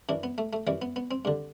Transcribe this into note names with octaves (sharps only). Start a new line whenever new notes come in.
F#2 E3 D4
B3
A3
A3
F#2 E3 G3
B3
B3
C4
G2 D3